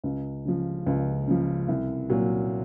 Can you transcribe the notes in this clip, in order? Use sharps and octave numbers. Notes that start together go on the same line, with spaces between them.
C#2
C#3 F3
C#2
C#3 F3
C2
A#2 F#3